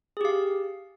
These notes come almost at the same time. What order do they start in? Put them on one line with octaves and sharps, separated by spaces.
G#4 G4 F5